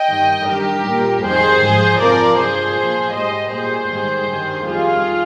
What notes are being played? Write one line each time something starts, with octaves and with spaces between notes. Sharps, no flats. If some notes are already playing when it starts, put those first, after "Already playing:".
Already playing: D#5 G5
G2 D#3 G3
G2 D#3 G3 G4 A#4
A#2 G3
F2 D#3 G3 G#4 C5
G#2 F3
F2 C3 F3 A#4 D5
G2 F3 G#4 C5
A#2 F3
G#2 G3 C5 D#5
A#2 G3 G#4 C5
G#2 D#3 G3
G2 D#3 G3
F2 D#3 G3 F4 G#4